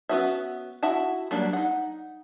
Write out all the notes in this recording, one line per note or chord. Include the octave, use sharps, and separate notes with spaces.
B3 C#4 F#4 C5 E5
E4 F#4 E5 F#5 A5
F#3 G3 A#3 D4
D#4 F#5